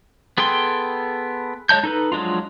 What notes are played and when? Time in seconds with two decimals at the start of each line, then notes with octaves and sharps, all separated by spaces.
0.38 B3 G#4 A4 G5 C6
1.69 G#3 C#5 D#5 A5 G6
1.83 D#4 A4 B4
2.12 F3 F#3 G#3 D4 F4